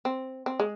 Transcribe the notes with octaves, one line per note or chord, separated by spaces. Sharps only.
C4
C4
G#3